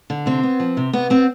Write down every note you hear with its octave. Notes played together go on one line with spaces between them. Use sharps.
D3
C3 C4
B3
F3
C3
C3 B3
B3 C4